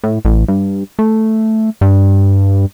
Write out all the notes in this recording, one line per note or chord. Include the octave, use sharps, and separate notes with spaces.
A2
A1
G2
A3
G2